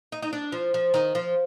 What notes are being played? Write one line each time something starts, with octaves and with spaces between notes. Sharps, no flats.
D#4
D#4
D4
F3
F3
D#3
F3